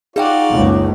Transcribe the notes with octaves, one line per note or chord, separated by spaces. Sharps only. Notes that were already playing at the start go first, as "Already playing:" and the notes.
D#4 F4 F#4 G#4 D5 F5 G5
F#1 C#2